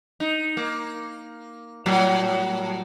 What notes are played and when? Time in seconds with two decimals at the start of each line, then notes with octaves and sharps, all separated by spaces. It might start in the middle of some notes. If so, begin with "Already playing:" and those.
0.20 D#4
0.57 A#3
1.86 A2 F#3 G3